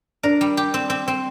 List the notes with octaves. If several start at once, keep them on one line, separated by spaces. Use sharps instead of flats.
D4 A#4
G3
G4
C4
C4
C4